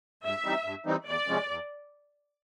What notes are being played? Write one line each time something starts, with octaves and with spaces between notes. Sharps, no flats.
G2 E5
E3 G3 C4 D#4
G2
E3 G3 C4 D#4
E2 D5
C3 F3 G#3 C#4
E2